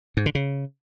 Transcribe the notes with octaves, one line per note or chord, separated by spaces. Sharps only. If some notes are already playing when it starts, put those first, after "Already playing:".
G#2
D3
C#3